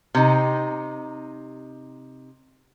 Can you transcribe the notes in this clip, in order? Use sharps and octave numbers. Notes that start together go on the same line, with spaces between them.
C3 D#4